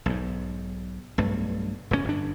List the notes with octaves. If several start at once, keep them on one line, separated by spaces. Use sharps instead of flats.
B1 G#2
B1 G2 A3
F1 E2 C3 C#4
G1 D4